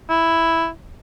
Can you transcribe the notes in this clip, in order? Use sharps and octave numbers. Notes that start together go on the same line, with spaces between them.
E4